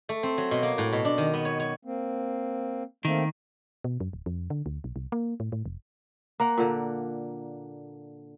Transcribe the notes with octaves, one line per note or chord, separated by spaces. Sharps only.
A3
C4
F#3
B2
A#3
A2
B2
D4
D#3
B3
C#5
C#5
A#3 C4
D#3 A3 A#3 C4
B2
F#2
D1
F2
D3
D2
B1
C2
A#3
A2
A2
F1
A#3 A#4 F#5
A#2 D3